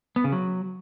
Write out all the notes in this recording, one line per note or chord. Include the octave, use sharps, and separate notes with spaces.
B3
C#3
F#3